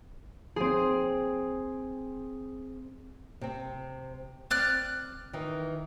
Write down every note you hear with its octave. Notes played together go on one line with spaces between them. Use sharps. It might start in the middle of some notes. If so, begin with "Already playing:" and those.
C4 G#4
C3 C4
C4 D5 F6 F#6
D#3 E3